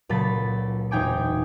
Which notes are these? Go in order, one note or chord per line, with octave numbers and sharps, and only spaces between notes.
C#2 A#2 F#3 A4 B5 A6
E1 D#4 G5 G#5 D6